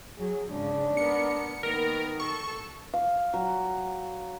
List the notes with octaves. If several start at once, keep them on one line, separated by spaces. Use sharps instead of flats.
F#3 G#4
G#2 C#3 D4
B3 A#4 C#7
D#3 A#3 B3 A#4
A4 C#6
F5
F#3